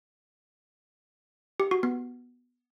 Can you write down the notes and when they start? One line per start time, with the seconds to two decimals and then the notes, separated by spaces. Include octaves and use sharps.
1.60 G4
1.71 F#4
1.83 B3